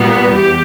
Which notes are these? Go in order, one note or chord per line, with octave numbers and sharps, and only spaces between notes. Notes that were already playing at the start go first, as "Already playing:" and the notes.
Already playing: A#2 G3 B3
E2 G4